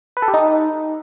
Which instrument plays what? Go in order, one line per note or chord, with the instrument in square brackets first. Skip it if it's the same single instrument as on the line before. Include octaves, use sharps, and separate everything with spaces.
[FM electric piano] B4
A4
G4
D#4